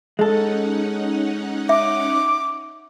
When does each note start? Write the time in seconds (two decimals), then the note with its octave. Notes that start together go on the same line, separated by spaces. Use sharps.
0.19 G#3 C#4 D#4 A4 F#5
1.69 E5 D6